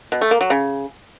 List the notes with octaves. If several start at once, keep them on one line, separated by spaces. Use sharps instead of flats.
B2
A3
A#3
F#3
C#3